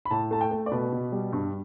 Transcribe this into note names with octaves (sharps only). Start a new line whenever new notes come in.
B5
A2 A5
A3 A5
G5
A3
D5
B2 B4
B2
G3
G2